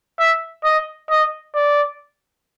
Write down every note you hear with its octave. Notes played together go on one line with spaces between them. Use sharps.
E5
D#5
D#5
D5